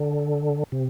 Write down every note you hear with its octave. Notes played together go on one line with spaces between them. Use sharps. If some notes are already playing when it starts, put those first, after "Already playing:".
Already playing: D3
C3